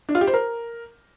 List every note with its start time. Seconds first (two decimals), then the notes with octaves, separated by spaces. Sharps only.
0.09 D4
0.15 F4
0.21 G4
0.27 C5
0.34 A#4